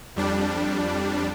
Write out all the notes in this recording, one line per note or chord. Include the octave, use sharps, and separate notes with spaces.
F2 G3 D4